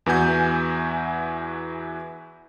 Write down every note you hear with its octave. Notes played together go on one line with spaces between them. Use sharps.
E2 E3 B3 F#4 G#5 G6